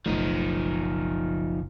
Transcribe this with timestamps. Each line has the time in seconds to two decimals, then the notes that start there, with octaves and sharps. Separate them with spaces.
0.06 F#1 B1 F3 A3 D#4